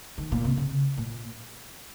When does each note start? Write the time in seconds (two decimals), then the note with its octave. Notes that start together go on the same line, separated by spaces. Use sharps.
0.18 D#3
0.32 A#2
0.45 C3
0.57 C#3
0.97 A#2